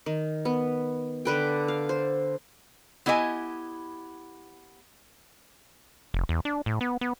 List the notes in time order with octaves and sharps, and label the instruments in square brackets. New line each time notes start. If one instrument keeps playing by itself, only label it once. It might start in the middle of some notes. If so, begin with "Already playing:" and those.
[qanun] D#3
B3
D3 B4 G5
F5
C5
[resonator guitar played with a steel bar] B3 E4 G4 D#5 E5 G#5
[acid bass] F1
E2
D4
A2
B3
B3